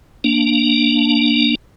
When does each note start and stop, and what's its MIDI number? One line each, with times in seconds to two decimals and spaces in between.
0.24 1.55 58
0.24 1.55 62